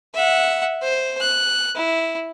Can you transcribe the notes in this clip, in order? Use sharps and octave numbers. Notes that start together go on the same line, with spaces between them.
E5 F#5
C5
F#6
E4